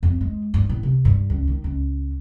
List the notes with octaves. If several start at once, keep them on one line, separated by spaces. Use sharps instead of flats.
F2
G#3
G2
A2
C3
G2
C#2
D#3
C#2